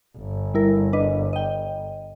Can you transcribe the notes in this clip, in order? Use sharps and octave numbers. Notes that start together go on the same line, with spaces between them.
G1
G3 E4 A#4
D4 B4 D#5
D#5 G5